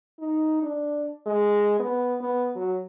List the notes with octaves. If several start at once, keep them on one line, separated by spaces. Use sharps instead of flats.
D#4
D4
G#3
B3
B3
F#3